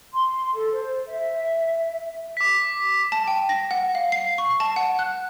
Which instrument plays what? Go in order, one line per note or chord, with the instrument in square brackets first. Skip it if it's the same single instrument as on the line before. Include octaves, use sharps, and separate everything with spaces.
[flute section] C6
A4
C5
E5
[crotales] D6 B6
[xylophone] A5
G5
A#6
F#5
F5
C7
C#6
A5
F#5
F#6